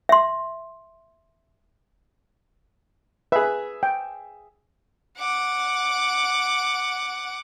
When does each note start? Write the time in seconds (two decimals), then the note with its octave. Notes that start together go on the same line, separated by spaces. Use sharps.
0.09 E5 C6
3.32 G#4 B4 E5
3.83 G5
5.19 F#5 D6